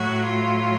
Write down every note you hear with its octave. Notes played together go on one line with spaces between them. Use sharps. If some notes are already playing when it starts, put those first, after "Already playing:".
Already playing: A2 F#3 F#4
F4